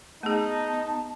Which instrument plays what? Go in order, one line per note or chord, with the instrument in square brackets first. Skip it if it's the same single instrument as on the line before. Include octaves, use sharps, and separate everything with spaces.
[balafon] A3 G#4 [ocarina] B3 [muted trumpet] D#4 [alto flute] A5